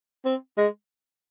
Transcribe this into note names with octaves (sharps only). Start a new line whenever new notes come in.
C4
G#3